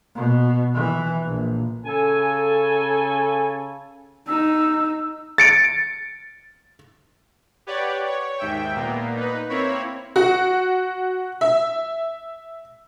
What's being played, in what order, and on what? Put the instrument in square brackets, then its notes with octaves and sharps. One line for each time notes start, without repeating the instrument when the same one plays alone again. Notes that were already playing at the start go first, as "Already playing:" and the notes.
[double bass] B2
E3
A#1
[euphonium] C#3 [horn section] A4 G#5
[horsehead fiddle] D#4 [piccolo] E6
[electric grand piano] A6 C#7 D7
[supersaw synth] G4 B4 C#5 D5 F#5
C#5
D#2 G#2 E5 G5
A#2 A#3 B3
D#4 B4
A#3 C4 E4 C#5 B5
[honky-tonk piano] F#4
E5